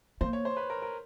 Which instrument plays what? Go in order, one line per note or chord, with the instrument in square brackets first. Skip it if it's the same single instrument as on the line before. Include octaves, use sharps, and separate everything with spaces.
[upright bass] A#3 [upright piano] C5
[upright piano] C#5
C5
B4
A#4
A#4